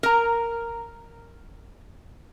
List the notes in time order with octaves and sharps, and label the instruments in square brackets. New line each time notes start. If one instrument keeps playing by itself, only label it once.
[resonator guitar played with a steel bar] A#4 A#5